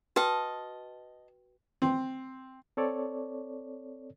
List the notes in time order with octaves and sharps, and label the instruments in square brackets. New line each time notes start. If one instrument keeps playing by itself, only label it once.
[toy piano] F#4 B4 G5 [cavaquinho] D#5 A5
[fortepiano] C4
[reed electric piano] C4 A4 C#5 D5